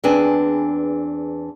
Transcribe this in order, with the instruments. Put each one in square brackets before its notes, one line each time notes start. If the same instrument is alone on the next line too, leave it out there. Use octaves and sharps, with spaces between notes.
[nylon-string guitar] E2 C4 D4 G#4 B4 G#5